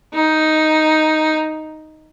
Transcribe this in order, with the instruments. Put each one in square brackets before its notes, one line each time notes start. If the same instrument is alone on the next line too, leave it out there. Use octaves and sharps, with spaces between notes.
[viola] D#4